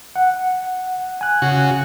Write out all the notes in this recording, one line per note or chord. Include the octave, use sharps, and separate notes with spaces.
F#5
G#5 F#6
C#3 F#4